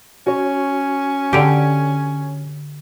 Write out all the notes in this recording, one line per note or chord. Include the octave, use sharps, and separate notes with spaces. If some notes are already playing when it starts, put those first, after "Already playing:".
C#4 F#4 C#5
D3 G4